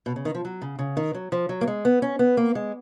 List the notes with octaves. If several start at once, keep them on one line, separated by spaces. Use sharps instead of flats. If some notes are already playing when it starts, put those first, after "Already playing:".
B2
C#3
D#3
F3
F#3
C#3
C#3
D#3
F#3
F3
F#3
A#3
G#3
B3
C#4
B3
A#3
G#3